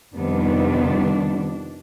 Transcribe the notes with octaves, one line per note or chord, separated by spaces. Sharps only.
F2 C3 D#3 G3 B3 D4